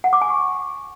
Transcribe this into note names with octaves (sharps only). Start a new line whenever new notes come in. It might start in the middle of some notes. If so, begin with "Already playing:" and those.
F#5
D6
G#5
C#6